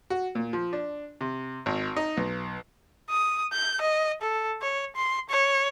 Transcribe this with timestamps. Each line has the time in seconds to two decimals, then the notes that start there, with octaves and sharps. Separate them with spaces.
0.10 F#4
0.35 A#2
0.53 F3
0.73 D4
1.21 C3
1.66 G#1
1.97 D#4
2.17 B1
3.10 D#6
3.53 G6
3.81 D#5
4.21 A4
4.62 C#5
4.96 C6
5.29 C#5